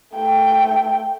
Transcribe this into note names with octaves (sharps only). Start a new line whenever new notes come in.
A3 G5